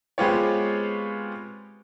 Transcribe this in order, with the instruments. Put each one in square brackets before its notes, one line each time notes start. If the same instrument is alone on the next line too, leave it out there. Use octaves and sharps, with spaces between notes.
[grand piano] G#3 B3 C4 F4 G4 C#5